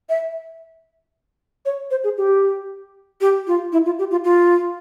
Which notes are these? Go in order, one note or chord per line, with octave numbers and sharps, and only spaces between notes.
E5
C#5
C5
G#4
G4
G4
F4
E4
F4
G4
F4
F4